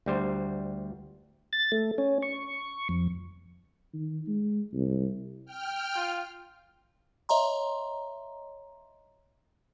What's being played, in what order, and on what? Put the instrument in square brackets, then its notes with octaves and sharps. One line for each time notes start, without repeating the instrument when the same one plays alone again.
[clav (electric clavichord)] D2 G3 C5
[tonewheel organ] A6
A3
C#4
C#6
F2
[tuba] D#3
G#3
C2
[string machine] G5 F6
[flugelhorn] F4
[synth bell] C#5 D#5 E5 A#5 C6